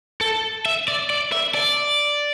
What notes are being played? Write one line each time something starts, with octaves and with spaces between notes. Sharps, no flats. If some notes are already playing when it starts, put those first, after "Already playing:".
A4
E5
D5
D5
E5
D5